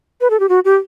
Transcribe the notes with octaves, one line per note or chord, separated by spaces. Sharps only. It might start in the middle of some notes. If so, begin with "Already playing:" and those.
B4
A4
G4
F#4
G4